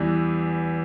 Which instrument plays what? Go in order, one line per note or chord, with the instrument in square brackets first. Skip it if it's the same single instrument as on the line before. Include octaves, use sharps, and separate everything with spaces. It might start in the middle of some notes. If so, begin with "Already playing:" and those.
Already playing: [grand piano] E2 E3 G3